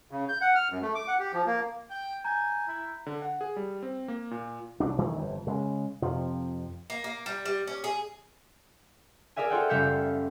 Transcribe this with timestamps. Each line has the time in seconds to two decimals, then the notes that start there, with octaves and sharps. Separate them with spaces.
0.11 C#3
0.29 G6
0.41 F#5
0.55 F6
0.70 F#2
0.82 A3
0.95 D6
1.08 F#5
1.19 G4
1.33 F3
1.46 A#3
1.91 G5
2.24 G#5 A#5 G6
2.68 E4
3.06 D3
3.22 F#5
3.41 G#4
3.56 G3
3.83 C4
4.08 A#3
4.31 A#2
4.80 C2 F#3 D4
4.98 D#3 E3 A3
5.16 G1 F2
5.47 C#3 G#3
6.02 F2 C3 F3
6.90 A#3
7.04 A#3
7.26 G3
7.45 G3
7.67 C#4
7.84 G#4
9.36 G#4 A#4 D5 E5 G#5
9.50 F4 A4 C5 D5 F#5 G5
9.69 F#1 G3 E5 F5 G6 C#7